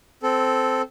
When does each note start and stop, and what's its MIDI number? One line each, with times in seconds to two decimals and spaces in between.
0.23 0.82 60
0.23 0.82 69